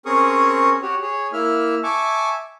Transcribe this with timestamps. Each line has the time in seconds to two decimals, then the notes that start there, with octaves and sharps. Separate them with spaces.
0.06 C4 C#4 G#4 A#4 C#6 D#6
0.82 F#4 G4 C#5
1.02 G#4 C#5
1.33 A#3 E4 E5 F6
1.84 E5 G#5 A5 C#6 D6